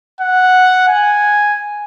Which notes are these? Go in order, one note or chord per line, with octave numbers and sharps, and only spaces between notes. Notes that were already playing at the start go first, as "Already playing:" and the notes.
F#5
G#5